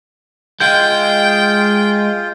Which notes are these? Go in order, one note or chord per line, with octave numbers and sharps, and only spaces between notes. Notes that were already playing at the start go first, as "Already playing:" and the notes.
G#3 F4 G5 G6